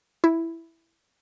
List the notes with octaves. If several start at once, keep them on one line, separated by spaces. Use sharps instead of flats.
E4